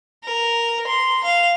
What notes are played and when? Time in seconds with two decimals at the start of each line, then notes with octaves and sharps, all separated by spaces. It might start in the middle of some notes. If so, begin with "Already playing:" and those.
0.24 A#4
0.88 C6
1.24 F5